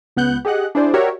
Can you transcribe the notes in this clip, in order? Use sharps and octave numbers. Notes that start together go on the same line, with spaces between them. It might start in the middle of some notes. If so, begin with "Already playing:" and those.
C#2 B3 F#5 F#6 G6
G4 G#4 D#5 F#5 F#6
D4 E4 G#4 C5 D5
F#4 G4 A#4 C#5 D5 E5